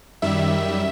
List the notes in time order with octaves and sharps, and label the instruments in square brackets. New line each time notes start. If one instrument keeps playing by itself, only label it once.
[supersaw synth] F#2 D#3 G3 E5